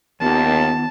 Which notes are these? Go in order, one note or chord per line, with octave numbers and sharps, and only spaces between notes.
D#2 D#3 B3 F4 A5